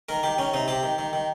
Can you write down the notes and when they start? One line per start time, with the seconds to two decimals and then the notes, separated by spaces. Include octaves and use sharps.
0.09 D#3 A#4
0.23 D#3 G4
0.38 D#3 C#4
0.54 C3 D#4
0.68 C3 G4
0.83 D#3
0.98 D#3
1.13 D#3